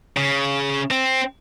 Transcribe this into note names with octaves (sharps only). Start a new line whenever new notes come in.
C#3
C4